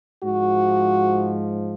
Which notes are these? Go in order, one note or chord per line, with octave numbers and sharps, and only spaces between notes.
G#2 F3 F#4